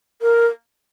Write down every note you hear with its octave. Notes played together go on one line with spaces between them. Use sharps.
A#4